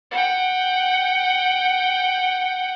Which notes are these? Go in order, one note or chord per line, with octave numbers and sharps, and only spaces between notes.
F#5 G5